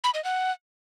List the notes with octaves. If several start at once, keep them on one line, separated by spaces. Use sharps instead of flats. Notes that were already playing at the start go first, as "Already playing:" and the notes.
B5
D#5
F#5